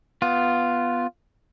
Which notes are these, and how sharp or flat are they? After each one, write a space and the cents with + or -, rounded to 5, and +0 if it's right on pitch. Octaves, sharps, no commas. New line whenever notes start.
B3 +0 F4 +0